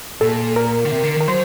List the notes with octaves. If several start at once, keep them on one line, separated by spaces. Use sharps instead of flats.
A#2 A4
A#4
D3
C3
D3
D#3 A#4
F#3 C5